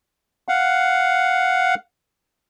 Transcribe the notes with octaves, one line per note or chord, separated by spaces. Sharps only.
F5 F#5